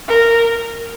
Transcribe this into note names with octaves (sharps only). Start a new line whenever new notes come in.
A#4